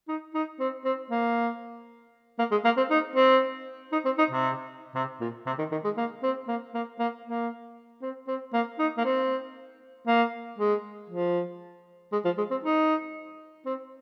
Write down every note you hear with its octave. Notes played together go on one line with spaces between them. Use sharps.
D#4
D#4
C4
C4
A#3
A#3
G#3
A#3
C4
D#4
C4
D#4
C4
D#4
C3
C3
A#2
C3
D#3
D#3
G#3
A#3
C4
A#3
A#3
A#3
A#3
C4
C4
A#3
D#4
A#3
C4
A#3
G#3
F3
G#3
F3
G#3
C4
D#4
C4